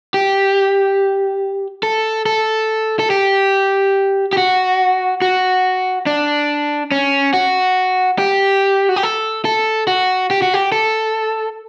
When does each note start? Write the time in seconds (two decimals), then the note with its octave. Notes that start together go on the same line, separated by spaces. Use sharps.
0.14 G4
1.83 A4
2.26 A4
2.99 A4
3.10 G4
4.33 G4
4.37 F#4
5.22 F#4
6.06 D4
6.91 C#4
7.34 F#4
8.18 G4
8.89 F#4
8.96 G4
9.03 A4
9.45 A4
9.87 F#4
10.31 G4
10.42 F#4
10.54 G4
10.72 A4